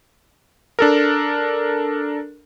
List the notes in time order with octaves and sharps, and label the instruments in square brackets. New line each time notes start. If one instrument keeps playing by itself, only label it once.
[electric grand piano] D4 A4 A#4